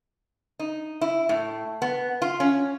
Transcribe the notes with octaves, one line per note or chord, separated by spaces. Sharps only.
D#4
E4
A2
B3
F4
C#4